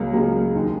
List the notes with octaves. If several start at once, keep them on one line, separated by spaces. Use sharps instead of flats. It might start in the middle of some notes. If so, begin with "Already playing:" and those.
Already playing: C#2 C#3 F#3 A#3
C#2 C#3 F#3 A#3
D#2 D#3 G#3